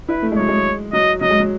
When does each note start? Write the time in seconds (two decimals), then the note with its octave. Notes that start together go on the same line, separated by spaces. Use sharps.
0.09 E4 B4
0.22 A3
0.32 G#3
0.37 F#3 C#5
0.48 G#3
0.93 F#3 D#5
1.21 F#3 D#5
1.30 G#3
1.40 F#3